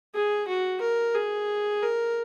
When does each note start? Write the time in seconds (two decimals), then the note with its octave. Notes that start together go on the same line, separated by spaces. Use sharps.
0.15 G#4
0.48 F#4
0.81 A#4
1.15 G#4
1.83 A#4